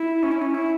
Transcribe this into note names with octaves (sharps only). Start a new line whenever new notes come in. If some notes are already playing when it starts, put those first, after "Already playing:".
Already playing: E4
C#4
E4
C#4
E4